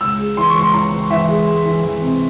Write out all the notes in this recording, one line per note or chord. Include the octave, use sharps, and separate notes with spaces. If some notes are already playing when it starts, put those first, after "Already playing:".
C#2 E6
G#3
E3 C6
C#6
C#2 C6
E3 A#5
C#2
E3 E5
G#3
G#3
E3
E3
C3